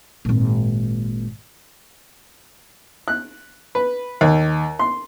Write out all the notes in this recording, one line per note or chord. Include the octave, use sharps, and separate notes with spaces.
G#1 A#2
F#6
B4
D#2
C6